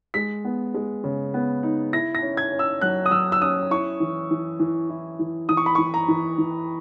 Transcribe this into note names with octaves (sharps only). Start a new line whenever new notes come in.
G#3 B6
B3
G#3
C#3
B3
D#4
E4 A#6
A#6
C#4
G#6
C#4
E6
F#3 F#6
D#6
F#3 E6
E6
C#4 D#6
E4 C#6
E3
E3
E3
E4
E3
E3 D#6
C#6
B5
E3 C#6
A#5
E3
E3